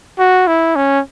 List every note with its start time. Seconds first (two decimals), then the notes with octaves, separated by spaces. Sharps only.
0.18 F#4
0.47 E4
0.76 C#4